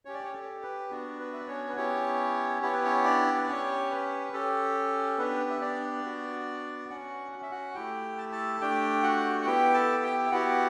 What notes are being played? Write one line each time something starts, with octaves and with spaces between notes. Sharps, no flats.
C#4 G4 C#5
D5
C#4 C#5
A4
B4
B3 D4 F#4
B4
E5
D5
C#4 C#5
B4
B3 C#4 E4 G4 C#5
B3 E4 G4 C#5
B4
C#4 C#5
D4 D5
B4
C#4 G4 C#5
B4
C#4 G4 A4
B3 D4 G4 B4
E5
D4 D5
B3 F#4
C#4 F#4 F#5
F#5
E5
F#4 F#5
A3 E4 G4 G5
A5
A4 A5
A3 D4 G4 G5
F#4 F#5
F#5
B3 E4 G4 G5
A4 A5
G4 G5
E5
B3 E4 F#4 G4 F#5